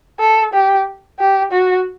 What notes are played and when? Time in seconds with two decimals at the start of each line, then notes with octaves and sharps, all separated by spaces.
0.20 A4
0.54 G4
1.19 G4
1.52 F#4